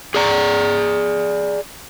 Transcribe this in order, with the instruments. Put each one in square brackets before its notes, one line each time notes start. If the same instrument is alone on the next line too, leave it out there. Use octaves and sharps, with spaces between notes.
[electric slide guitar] G#4 D5 A#5